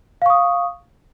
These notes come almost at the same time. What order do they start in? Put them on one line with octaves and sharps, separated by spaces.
F5 C#6 D#6